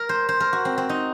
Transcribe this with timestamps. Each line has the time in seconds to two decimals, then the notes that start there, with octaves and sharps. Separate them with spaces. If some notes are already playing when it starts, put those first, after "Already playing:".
Already playing: A#4
0.09 C5
0.29 C5
0.40 A#4
0.53 F#4
0.65 C4
0.78 C4
0.89 D#4